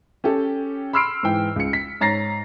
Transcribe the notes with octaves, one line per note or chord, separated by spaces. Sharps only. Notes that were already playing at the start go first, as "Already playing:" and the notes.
C#4 G4 A4
B5 C6 E6 F6 C7 D7
G#2 E3 G5
C#2 C#7
B6
G#2 C#5 A#5 A6 A#6 C7